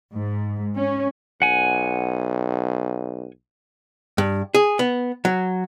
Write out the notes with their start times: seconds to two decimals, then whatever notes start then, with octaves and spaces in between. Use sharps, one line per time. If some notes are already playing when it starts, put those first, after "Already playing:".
0.14 G#2
0.74 C#4
1.42 B1 F#5 G#5
4.18 G2
4.55 G#4
4.79 B3
5.25 F#3